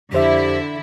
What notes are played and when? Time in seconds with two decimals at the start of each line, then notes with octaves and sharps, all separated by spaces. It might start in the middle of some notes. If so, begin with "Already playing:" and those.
0.13 F2 D3 E4 G4 C5 E5